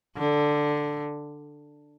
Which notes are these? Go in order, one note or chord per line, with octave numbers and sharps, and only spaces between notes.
D3